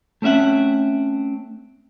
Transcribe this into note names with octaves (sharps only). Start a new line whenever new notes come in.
A3 C4 C#4 E5 F#5